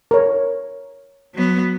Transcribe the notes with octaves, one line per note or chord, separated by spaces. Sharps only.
A#4 C#5
F#3 B3